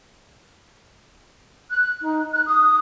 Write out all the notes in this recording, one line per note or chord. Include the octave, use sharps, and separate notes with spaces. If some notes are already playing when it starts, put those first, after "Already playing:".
F#6
D#4
F#6
D#6